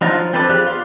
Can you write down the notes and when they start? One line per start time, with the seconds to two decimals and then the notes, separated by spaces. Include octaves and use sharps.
0.01 F3 F#3 D4 D#4 F4
0.15 F3
0.33 C4 D4 A4 B4 D5
0.49 F3 G4 G#4 D5 F#6
0.67 B3 F4 D5 F5 C6